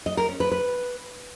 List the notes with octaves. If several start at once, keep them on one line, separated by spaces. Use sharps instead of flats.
D#5
A#4
C#4
B4
B4